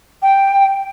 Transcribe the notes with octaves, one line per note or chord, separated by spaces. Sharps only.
G5